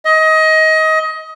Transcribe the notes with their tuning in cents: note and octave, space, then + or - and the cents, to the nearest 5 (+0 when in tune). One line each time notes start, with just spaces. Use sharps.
D#5 +25